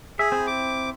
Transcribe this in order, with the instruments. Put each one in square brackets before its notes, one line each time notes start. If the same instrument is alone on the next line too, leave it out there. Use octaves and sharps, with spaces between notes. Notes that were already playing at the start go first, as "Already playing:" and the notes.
[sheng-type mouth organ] G#4 [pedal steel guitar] E5
[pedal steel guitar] C4 E4
[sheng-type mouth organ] D6